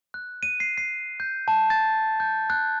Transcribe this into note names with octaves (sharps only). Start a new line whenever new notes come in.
F#6
D#7
C7
C7
G6
A5
A6
G6
F#6